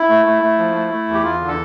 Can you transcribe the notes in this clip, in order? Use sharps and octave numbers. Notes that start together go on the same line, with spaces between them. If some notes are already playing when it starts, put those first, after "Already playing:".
Already playing: E4
A3
A3
A3
F3
A3
A3
E2
G4
E2 F4
D3
A4